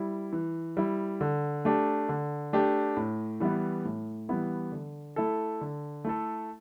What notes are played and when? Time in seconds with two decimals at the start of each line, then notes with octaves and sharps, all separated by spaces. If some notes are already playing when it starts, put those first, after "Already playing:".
Already playing: G3 E4
0.33 E3
0.77 G3 E4
1.21 D3
1.65 A3 D4 G4
2.09 D3
2.53 A3 D4 G4
2.97 A2
3.40 E3 G3 B3 E4
3.85 A2
4.29 E3 G3 B3 E4
4.72 D3
5.16 A3 E4 A4
5.61 D3
6.05 A3 E4 A4